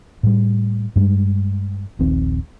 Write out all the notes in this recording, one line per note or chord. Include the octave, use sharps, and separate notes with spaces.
A2 G3
G2 G3 G#3
D#1 A#1 D#3 C4